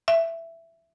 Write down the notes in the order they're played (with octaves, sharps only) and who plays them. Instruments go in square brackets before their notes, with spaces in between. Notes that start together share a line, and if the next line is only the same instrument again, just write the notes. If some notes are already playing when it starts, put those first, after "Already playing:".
[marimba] E5